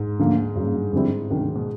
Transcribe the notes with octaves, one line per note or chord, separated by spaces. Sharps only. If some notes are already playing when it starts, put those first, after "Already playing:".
Already playing: G#2
D2 D3 F3 A#3
G2 C#3 F#3 A#3
F2 G#2 D3 G3 C4 E4
D2 C3 D#3 F#3
B2